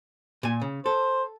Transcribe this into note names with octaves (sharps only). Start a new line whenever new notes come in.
A#2 G#5
C#3
A4 C5